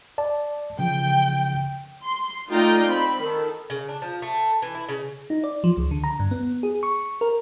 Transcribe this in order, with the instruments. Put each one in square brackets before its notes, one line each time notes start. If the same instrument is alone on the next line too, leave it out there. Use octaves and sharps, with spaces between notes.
[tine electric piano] D5 A5
[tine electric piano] C#3 F3 [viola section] G5
[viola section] C6
A3 D#4 F4 D5 G5 A#5
C4 B5
D#3 A4
[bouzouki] C#3
D4
F3
A3
E3
E4
C#3
[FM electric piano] D#4
D5
F3
C#2
D3
A#5
G2
B3
G#4
C#6
A#4